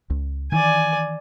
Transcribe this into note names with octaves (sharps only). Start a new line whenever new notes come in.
C#2
D#3 E3 D5 G#5